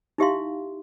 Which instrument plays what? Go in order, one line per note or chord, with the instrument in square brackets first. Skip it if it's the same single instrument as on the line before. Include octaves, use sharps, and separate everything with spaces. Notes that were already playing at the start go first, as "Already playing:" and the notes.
[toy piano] D#4 E4 G4 E5 F5 C6